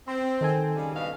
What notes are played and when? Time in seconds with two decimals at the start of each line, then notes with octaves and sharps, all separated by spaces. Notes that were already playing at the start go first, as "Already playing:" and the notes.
0.08 C4 C6
0.41 D#3 A4 G#5
0.76 C#3 G3
0.95 G2 B2 F5